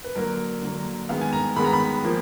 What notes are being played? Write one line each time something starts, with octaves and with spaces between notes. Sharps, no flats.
B4
D3 F#3 A#3 A#4
D3 F#3 A#3
G#2 D#3 G#3 B3 F5
G#5
A#5
G#2 D#3 G#3 B3 B5
A#5
B5
F3 A#3